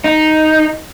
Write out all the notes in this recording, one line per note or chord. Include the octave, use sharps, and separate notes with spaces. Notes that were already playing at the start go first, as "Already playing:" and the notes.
D#4